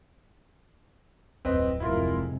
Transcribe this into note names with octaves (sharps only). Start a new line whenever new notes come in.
D1 F2 C4 B4 D#5
F1 C3 G#3 E4 F4 A#4